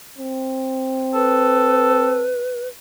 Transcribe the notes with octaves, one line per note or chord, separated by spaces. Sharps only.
C4
A4 B4